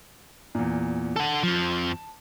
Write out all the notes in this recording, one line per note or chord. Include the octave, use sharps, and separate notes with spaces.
E2 A#2
A4 F#5 A5
F2 F3